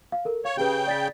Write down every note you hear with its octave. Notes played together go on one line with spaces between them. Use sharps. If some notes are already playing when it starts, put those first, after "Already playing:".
F5
A4 A#4
C#5 F5
C#3 G4 G#4 B4 G5
D5 A6 B6